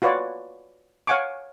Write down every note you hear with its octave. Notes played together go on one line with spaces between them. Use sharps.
F4 F#4 B4 C#5 D5
C#5 F5 F#5 G#5 C#6 D6